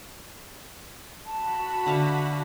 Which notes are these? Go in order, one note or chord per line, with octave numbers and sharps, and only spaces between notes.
F#4 A5 B5
D3 E5 F5